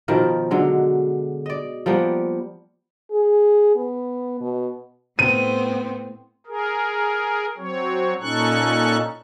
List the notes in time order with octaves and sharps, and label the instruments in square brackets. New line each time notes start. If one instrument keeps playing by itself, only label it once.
[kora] B2 D#3 F3 A#4
D3 F#3 G#3
D5 D#5
F3 G3 A#3 B3
[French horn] G#4
B3
B2
[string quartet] A2 B3 C4 [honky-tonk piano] D#7
[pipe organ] G#4 A#4
F#3 C4 C#5
A#2 C#4 D#4 A4 C#6 F#6